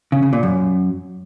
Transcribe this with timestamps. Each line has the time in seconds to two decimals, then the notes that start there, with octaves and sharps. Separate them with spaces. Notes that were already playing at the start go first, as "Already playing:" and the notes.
0.12 C#3
0.22 C#3
0.33 A#2
0.43 F#2